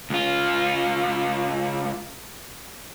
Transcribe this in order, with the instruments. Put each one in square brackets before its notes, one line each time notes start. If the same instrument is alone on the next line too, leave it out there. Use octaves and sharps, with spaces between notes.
[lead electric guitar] C#2 F4